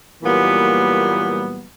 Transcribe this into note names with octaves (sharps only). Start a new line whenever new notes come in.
A#2 E3 F#3 G3 A#3 B3